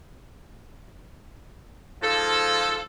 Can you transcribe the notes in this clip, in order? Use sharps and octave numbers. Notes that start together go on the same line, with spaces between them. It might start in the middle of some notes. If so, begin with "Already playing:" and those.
G#2 F3 F4 A4